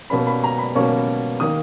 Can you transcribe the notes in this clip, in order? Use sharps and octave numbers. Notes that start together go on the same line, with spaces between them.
B2 A#3 C#4 B5
B5
A#5
B5
B2 A#3 C#4 C#6
D#3 A#3 D#6